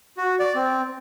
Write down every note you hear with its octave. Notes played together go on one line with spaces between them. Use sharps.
F#4
D5
C4